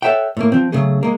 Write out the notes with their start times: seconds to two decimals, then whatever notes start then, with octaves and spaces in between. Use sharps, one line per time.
0.02 A4 C#5 E5 F#5 G5
0.37 A2 A#3
0.52 F3 C4
0.72 C#3 F#3 A3 G#4
1.03 G#3 A#3